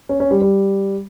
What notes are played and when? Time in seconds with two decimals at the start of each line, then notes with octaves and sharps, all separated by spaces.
0.09 C#4
0.20 C#4
0.31 G3
0.42 G3